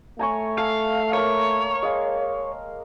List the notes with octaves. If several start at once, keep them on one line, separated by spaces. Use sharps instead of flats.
A3 C#5 G#5 A#5
A4 F5
A#3 A#4 C#5
G#3 F5